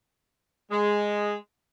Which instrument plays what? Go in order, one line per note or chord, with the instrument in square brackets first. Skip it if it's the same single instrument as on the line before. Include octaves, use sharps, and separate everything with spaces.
[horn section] G#3